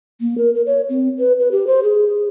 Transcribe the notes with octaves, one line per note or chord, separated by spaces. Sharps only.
A#3
A#4
A#4
C#5
C4
B4
B4
G4
C5
G#4